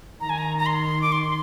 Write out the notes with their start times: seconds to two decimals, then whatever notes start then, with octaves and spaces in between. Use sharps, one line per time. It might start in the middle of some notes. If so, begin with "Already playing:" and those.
0.21 D#3 A#5
0.29 G#5
0.38 A#5
0.58 A#5
0.66 C6
1.02 D6
1.12 C6